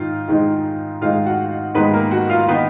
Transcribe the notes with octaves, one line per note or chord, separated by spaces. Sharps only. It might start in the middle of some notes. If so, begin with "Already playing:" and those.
Already playing: G#2 D#3 D#4 F4
G#2 D#3 G#3 D#4
G#2 D#3 G#3 D#4 F4 F5
F#4 F#5
G#2 D#3 G#3 B3 D#4 B4
A#3 A#4
F#4 F#5
F4 F5
D#3 A#3 B3 D#4 B4